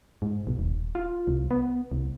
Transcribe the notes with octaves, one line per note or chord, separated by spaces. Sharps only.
G#2
B1
D#1
F4
C2
B3
C2